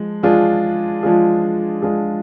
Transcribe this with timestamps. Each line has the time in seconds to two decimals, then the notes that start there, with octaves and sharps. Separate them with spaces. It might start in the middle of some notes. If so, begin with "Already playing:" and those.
Already playing: F3 G#3
0.23 F3 G#3 D4 F4 G#4
1.03 F3 G#3 D4 F4 G#4
1.82 F3 G#3 D4 F4 G#4